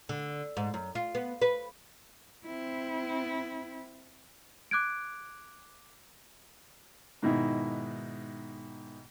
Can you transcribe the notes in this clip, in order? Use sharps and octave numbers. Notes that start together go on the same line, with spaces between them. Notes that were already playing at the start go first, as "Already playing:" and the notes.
D3
G#2
F#2
F4
B3
B4
C4 E4
D6 F#6 G#6 D7
G#2 B2 D#3 E4